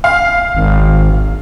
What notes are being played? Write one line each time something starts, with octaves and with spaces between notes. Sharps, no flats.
F5
G#1